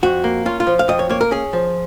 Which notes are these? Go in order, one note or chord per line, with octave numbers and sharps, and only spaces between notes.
F2 F#4
A#3
C#4 F4
F4
F3
F5
F2 D#5
C#5
A#3 C#5
A#4
C#4 G#4
F3